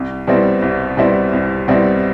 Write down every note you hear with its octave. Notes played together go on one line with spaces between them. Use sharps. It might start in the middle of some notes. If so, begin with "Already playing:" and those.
Already playing: C2
B2 G3 C4 E4
C2
B2 G3 C4 E4
C2
B2 G3 C4 E4